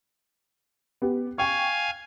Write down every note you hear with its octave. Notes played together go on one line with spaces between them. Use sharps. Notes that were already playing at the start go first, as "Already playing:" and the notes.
B3 G4
F5 G5 G#5 C#6